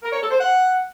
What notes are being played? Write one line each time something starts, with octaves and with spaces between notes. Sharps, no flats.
A#4
C#5
A4
C5
F#5